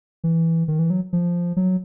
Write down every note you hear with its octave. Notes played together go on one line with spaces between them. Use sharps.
E3
D#3
E3
F#3
F3
F#3